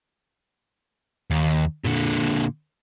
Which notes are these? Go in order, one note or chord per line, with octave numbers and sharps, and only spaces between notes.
D#2
A#2 D3